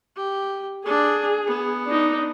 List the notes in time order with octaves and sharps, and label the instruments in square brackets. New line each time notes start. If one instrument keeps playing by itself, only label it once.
[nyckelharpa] G4
[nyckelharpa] D4 [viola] G#4
[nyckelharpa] B3
[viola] D4 D#4